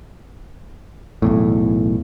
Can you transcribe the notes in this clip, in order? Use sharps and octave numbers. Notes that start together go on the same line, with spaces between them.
B1 E2 A2